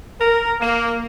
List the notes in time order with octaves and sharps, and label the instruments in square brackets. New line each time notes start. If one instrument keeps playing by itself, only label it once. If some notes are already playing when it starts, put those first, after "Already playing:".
[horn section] A#4
A#3